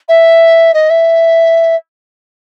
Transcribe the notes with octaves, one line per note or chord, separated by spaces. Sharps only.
E5
D#5
E5